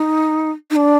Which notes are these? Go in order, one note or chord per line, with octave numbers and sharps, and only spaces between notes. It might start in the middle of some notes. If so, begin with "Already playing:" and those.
Already playing: D#4
D#4
D4